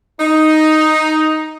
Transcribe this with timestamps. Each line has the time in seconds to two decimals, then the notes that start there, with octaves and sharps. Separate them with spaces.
0.20 D#4